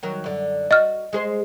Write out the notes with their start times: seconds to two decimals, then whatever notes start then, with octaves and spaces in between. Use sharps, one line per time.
0.03 D#3 F#3 A#4
0.24 F#2 D3
0.71 F#4 D#5 F6
1.13 G#3 G#4 C5